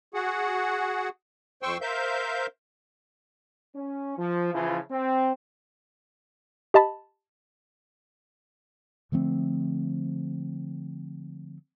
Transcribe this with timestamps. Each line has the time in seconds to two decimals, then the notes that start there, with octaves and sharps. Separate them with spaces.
0.14 F#4 G#4 F#5
1.63 F2 C5 G5 C6 C#6 E6
1.81 A#4 C5 E5 F5 G6
3.76 C#4
4.18 F3
4.53 C#3 E3 F3 E4 F4
4.91 C4
6.74 G4 D#5 A5 B5
9.12 D3 F3 A3 C4